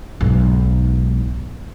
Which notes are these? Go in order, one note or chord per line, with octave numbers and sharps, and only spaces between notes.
B1 G#2